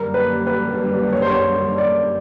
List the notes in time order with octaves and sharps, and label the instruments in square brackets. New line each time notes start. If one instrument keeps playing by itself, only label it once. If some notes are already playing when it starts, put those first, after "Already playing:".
Already playing: [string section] F#2 D3 G3 A#3 [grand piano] A#4
[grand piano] B4
B4
C#5
C5
C#5
D5